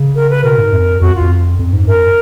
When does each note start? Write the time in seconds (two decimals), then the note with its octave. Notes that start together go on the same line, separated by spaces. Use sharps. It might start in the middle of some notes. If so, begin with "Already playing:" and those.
Already playing: C#3
0.15 A#4
0.30 B4
0.44 B2 A#4
0.58 G#2
0.73 F2
1.01 F2 F#4
1.15 F4
1.21 F2
1.59 F2
1.73 G#2
1.87 F#2 A#4